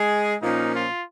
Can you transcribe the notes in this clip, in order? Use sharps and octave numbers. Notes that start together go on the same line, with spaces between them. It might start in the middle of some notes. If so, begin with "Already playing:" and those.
Already playing: G#3 G#4
A#2 F3 A#3 C#4 D#4
F4